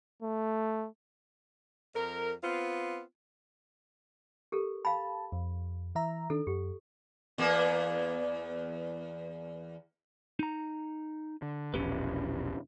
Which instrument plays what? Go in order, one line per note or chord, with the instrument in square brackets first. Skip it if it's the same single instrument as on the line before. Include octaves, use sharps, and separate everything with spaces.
[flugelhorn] A3
[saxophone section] F2 A#4
B3 C4 F4
[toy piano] G4 A4 A#4
[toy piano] F5 B5 [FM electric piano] A5
[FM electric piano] F2
E3 E5 A#5
[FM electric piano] D#3 D4 [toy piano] A4
[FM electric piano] F#2 [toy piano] G4
[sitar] E2 A#3 B3
[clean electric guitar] D#4 A#5
[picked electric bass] D3
[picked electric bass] E1 A#1 [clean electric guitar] C#4 G4 B4